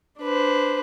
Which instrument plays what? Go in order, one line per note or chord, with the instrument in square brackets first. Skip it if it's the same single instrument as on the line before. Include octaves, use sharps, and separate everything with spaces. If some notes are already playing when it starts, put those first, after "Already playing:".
[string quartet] D4 B4 C5